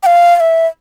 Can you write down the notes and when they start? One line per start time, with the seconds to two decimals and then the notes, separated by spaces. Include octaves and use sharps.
0.03 G5
0.06 F5
0.36 F5
0.40 E5